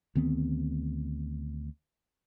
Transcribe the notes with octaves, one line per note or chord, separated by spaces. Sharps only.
D2 D#3 B3 C4